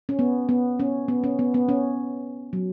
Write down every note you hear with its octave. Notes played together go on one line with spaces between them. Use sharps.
C#4
B3
B3
C#4
B3
C#4
B3
B3
C#4
F#3